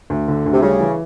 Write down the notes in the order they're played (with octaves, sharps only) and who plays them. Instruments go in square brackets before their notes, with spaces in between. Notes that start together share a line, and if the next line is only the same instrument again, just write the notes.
[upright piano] D2
D3
D2
[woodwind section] C3
[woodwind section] C#3 [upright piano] G3
[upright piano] E3